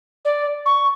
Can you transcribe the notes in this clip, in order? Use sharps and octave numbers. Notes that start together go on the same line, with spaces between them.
D5
C#6